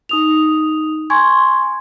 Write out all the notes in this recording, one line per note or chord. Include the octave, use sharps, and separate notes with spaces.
D#4 D#6 F7
G#5 C6 C#6 G#6